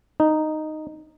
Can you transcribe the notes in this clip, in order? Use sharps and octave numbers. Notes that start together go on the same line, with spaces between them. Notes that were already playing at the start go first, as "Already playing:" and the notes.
D#4